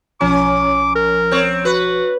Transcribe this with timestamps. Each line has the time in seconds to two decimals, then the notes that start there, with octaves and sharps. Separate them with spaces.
0.21 B1 F3 C#4 A#5 D6
0.96 A#4
1.31 C4 C#5
1.65 F#4 B4